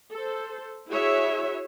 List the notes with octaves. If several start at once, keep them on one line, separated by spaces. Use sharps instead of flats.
A4 C5
E4 F#4 G#4 C#5 E5